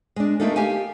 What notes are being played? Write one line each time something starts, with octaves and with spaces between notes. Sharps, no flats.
G#3 D4
A3 A#3 D4 D#4 F4 A4
G4 F5 G#5